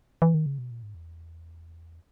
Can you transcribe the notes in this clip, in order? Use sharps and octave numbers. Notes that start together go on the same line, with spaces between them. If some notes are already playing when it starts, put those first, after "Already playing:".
E3
D#3
C#3
B2
A#2
G#2
E2